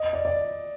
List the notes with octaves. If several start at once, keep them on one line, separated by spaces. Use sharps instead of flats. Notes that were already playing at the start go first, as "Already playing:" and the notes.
Already playing: D#5
D5
D5